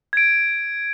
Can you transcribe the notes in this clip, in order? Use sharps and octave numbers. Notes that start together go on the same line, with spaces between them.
G#6 D7